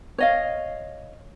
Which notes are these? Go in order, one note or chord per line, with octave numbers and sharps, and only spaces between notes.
C#5 D#5 F5